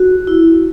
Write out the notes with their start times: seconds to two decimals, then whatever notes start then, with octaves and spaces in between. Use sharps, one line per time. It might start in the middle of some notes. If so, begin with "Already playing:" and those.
Already playing: F#4
0.27 E4